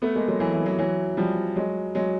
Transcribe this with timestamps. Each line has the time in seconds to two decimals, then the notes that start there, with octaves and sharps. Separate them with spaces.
0.02 A3 B3
0.15 G#3 A#3
0.28 F#3 G#3
0.40 E3 F#3
0.53 E3 F#3
0.66 E3 F#3
0.78 E3 F#3
1.17 F3 G3
1.56 F#3 G#3
1.95 F#3 G#3